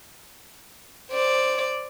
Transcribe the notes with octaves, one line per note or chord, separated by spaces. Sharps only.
C5 D5